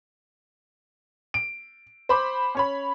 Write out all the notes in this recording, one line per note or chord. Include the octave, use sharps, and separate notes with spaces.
D7
C5 B5 D6
C#4 C#5 B5